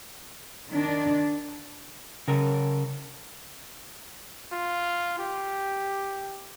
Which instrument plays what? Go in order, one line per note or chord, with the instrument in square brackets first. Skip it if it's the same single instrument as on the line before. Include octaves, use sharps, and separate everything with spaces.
[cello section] D#3 D4
[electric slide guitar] C#3 A#4
[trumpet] F4
G4